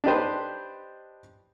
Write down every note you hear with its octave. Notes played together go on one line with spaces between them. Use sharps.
D4 D#4 G4 B4 C5